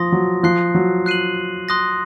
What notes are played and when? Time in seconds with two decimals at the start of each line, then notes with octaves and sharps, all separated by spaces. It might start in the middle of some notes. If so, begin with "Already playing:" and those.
Already playing: F3 C6 D#6 A#6
0.12 F#3
0.43 F3 C6 F#6 C7
0.75 F#3
1.06 F#6 C7 D#7 F#7
1.69 C6 D#6 F#6 A#6